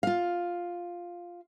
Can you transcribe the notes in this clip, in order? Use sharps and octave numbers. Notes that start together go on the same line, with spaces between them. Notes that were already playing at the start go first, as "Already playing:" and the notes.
F4 F5